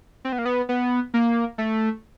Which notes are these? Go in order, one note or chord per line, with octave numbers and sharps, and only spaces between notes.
C4
B3
A#3
B3
B3
A#3
A3